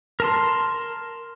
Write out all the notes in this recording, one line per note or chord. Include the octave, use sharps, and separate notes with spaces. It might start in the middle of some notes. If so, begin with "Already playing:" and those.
A#4 A5 C6